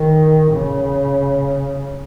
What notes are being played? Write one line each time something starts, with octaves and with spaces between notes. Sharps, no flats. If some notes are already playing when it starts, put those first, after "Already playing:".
Already playing: D#3
C#3